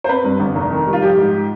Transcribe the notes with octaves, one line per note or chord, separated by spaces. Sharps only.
C5
C4 B4
G2
G1
F1
D#3
G3
F4
F3 G4
G#2